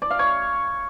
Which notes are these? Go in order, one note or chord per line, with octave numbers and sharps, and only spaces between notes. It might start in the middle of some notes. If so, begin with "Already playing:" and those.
D5
F5
C#5